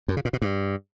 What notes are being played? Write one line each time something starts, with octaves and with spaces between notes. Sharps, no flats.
F#2
C#3
A#2
B2
G2